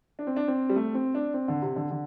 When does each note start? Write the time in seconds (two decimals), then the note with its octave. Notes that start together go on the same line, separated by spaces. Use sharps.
0.19 D4
0.27 C4
0.36 D4
0.48 C4
0.69 G3
0.76 A3
0.94 C4
1.15 D4
1.34 C4
1.48 D3
1.62 C3
1.76 D3
1.91 D3